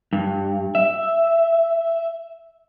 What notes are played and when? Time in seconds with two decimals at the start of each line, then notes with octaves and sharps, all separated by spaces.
0.13 G2
0.75 E5